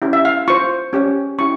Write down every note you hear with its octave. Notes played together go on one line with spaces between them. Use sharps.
C#4 E4 G4
E5
F5
F4 C5 C#6
C#4 G4 C#5
C#4 E4 G4 C#6